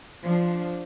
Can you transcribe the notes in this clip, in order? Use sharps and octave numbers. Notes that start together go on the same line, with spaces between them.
F3 D4